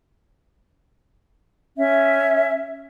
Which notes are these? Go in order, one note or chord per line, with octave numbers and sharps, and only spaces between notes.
C#4 E5